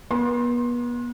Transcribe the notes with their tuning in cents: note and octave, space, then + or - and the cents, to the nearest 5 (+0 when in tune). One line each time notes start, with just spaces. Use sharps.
B3 -35 C6 +25